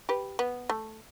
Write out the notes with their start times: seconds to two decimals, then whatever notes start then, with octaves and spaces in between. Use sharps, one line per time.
0.09 G4 B4
0.39 B3
0.70 A3